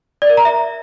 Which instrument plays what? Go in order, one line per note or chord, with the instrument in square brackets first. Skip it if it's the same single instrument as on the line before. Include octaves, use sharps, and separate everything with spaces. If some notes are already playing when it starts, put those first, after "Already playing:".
[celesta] D5
A#4
A#5
E5